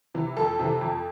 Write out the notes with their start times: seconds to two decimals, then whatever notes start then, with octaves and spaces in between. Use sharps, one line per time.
0.14 C3 E3
0.37 F2 A4
0.59 C3 E3
0.81 F2